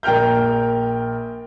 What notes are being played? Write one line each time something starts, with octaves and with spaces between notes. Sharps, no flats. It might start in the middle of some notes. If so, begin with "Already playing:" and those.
A#1 A#4 G5 F6 G6